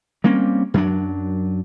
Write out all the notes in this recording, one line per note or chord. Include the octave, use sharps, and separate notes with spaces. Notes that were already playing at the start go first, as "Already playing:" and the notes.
G3 A#3 C4 C#4
F#2 F#3 D4